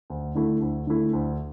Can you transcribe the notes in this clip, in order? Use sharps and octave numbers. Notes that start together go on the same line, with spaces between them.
D2
D3 A3 E4
D2
D3 A3 E4
D2